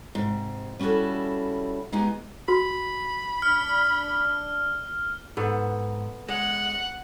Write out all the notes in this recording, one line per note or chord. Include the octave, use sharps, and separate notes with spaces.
G#2 C3
G3 C#4 E4 F#4 A4
G#3 B3 D#4 G4 G#4
F#4 B5
D4 F6
G#2 B3 A4
G#3 F#5